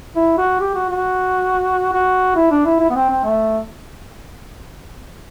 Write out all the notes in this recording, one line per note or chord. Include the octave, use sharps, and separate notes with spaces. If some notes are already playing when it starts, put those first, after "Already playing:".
E4
F#4
G4
F#4
F#4
F#4
E4
D4
E4
E4
B3
C4
C4
A3